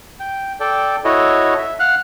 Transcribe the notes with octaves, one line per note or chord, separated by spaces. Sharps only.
G5
A4 D5 G5
E4 F#4 A4 C#5 D#5
E5
F5 F#5 F6 F#6